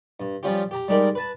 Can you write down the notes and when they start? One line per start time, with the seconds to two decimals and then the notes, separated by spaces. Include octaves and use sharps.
0.20 G2
0.43 F3 G3 C#4 F4 G4
0.71 G4 A#5
0.88 G3 G#3 D#4 G4 A#4 D5
1.15 B4 A5